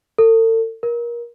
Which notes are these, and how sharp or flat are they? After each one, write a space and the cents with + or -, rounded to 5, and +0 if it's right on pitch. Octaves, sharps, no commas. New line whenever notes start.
A4 +40
A#4 +25